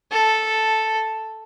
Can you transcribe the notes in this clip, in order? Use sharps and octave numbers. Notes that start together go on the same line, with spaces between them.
A4